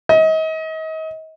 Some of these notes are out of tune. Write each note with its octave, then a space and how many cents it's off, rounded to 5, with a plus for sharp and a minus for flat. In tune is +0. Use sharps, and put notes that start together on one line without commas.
D#5 +35